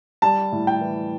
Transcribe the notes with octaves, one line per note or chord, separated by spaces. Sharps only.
G3 A5
A2
G5
E3